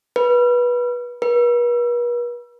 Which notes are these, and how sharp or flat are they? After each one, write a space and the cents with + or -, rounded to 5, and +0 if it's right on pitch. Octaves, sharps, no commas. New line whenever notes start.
B4 -20
B4 -45